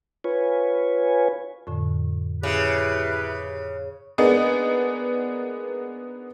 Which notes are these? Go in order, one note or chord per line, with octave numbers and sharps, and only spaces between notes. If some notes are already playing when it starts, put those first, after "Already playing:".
F4 B4 C#5 G#5
F2 A2 D3
C#3 E4 G4 B4
G#3 A#3 B3 D4 D#4 G#4